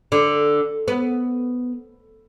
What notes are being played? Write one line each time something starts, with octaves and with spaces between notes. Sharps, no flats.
D3
B3